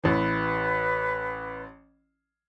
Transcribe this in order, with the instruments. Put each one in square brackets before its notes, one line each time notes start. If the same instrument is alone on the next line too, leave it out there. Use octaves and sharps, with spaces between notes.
[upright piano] A1 E3 [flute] B4